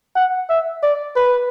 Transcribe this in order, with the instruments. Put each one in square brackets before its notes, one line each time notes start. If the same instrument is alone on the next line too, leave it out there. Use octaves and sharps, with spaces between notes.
[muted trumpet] F#5
E5
D5
B4